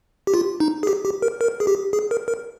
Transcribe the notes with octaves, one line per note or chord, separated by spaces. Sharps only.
G4
F4
D#4
G#4
G4
G4
A#4
A#4
G#4
G4
G#4
A#4
A#4